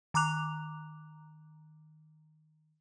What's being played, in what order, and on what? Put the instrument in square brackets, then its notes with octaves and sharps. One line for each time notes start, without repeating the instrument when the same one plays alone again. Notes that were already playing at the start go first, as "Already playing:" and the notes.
[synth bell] D#3 A#5 D6 F#6 F7